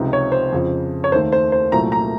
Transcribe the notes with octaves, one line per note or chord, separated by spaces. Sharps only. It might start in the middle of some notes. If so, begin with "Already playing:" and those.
Already playing: C#2 C3 F3 C4 D#4
C#5
C5
F2 C#3 F3
C#5
D#2 D#3 A3 C5
C5
C5
C2 A#2 F#3 A3 A#5
A#5